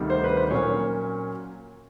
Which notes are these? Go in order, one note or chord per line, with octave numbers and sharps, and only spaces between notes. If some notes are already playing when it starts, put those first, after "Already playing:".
Already playing: D2 C3 D#3 G3
C5
B4
C5
A#2 F#3 A#3 C#4 C#5